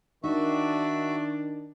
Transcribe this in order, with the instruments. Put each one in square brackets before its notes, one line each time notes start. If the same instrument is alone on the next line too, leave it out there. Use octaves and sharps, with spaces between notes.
[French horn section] D#3 D4 [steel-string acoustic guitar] D#4 [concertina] F#4 E5